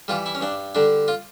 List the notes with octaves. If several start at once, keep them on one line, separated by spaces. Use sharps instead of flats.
E3 G3 F4
E4
C#4
G2 D4
D3 G3 D4
F4